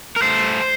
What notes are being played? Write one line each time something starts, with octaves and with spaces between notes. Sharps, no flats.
A#4
A3 C5